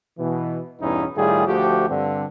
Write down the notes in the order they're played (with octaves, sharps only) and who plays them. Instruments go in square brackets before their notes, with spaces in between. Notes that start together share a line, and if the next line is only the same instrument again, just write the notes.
[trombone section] B2 E3
E2 G2 B2 C#4 D#4 E4
A2 D#3 G3 F4 G#4
D2 F3 A3 F#4 G4
G2 D3 C4